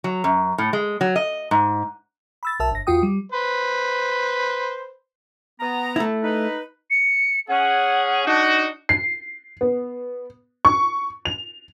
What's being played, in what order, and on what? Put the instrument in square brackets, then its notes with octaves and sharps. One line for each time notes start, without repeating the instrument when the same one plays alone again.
[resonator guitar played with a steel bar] F#3
F#2
A2
G#3
F#3
D#5
G#2
[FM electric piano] B5 E6 A6
B1 A#4 E5 A5 E6
G1 A#6
E2 F4 F#4 G5 D#6
G3
[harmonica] B4 C5
[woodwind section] B3 A#5
[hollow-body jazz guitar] A3 E4
[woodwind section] D#4 B4
[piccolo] C#7
[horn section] C#4 G#4 [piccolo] F#5
[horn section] D4 D#4 F#4
[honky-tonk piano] C7
B3
C#6
F7